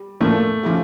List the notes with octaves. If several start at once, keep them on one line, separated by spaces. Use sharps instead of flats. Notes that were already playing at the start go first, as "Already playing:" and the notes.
Already playing: G3
A2 F3 A3 A#3 D4
C#3 F3 C#4 E4 G4